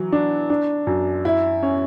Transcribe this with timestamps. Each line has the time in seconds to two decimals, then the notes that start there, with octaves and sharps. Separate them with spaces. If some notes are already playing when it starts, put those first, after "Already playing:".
Already playing: E3 F#3
0.12 D4
0.50 D4
0.87 F#2
1.25 E4
1.63 C#4